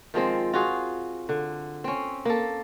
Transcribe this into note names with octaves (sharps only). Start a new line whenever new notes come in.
D#3 F3 G#3 C4
F4 F#4 G#4
D3
C4 C#4
A#3 A4